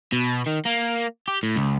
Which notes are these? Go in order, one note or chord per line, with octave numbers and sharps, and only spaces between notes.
B2
D#3
A#3
G4
A2
C#2